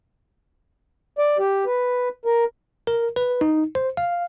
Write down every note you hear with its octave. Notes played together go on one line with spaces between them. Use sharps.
D5
G4
B4
A#4
A#4
B4
D#4
C5
F5